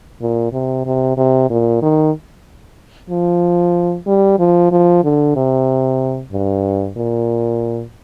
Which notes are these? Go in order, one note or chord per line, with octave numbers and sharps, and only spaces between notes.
A#2
C3
C3
C3
A#2
D#3
F3
G3
F3
F3
D3
C3
G2
A#2